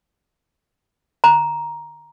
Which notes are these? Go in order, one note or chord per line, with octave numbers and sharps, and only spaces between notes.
A#5